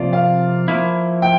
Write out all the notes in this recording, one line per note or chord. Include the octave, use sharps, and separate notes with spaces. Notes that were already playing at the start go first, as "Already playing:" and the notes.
Already playing: C3 F3 A#3 F4 D5
F5
F3 A#3 E4
G5